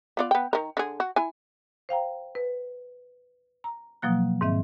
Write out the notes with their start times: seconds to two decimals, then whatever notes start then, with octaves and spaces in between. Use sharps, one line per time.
0.17 B3 F4 D5
0.31 B3 G5
0.53 D#3 A#4
0.77 D3 G#4
1.00 F#4
1.16 E4 G#5
1.89 C5 F5 G5 A#5
2.35 B4
3.64 A#5
4.02 B2 F3 F#3 A#3 F#6
4.41 G#2 D#3 C4 E5